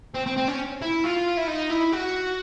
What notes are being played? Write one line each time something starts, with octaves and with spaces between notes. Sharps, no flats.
C4
C4
C4
C#4
E4
F4
E4
D#4
E4
F#4